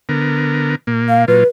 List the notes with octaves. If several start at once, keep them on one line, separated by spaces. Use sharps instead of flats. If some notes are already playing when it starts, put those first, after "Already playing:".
D3 B3 A#4
A#2 A#3
F5
A#2 F#3 F4 B4